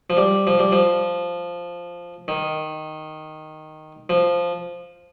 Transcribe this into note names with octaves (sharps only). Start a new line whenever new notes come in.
F3
G3
F3
G3
F3
D#3
F3